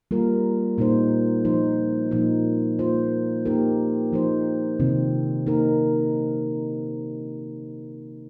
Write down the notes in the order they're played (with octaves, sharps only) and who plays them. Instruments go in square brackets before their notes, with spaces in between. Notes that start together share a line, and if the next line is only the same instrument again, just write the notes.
[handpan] G3 A#3 F4 A#4
A#2 A#3 D#4 C5
F3 D#4 C5
A#2 F3 A#3 D#4
A#3 F4 C5
A#3 D#4 G4 A#4
F3 D#4 C5
C3 D#3 C4
A#3 D#4 A#4